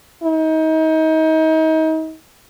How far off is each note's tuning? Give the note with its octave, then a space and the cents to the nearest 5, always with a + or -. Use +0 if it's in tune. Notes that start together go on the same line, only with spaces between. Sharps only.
D#4 +35